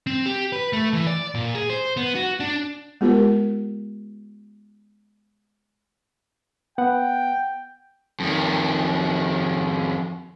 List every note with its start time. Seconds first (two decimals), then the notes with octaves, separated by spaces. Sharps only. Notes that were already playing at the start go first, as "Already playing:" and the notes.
0.07 C4
0.26 G4
0.53 B4
0.73 A3
0.93 E3
1.07 D5
1.35 A#2
1.55 G#4
1.70 C5
1.97 B3
2.15 F#4
2.40 D4
3.01 G#3 B3 F4 G4 A#4
6.78 B3 F#5 G5
8.20 F2 D#3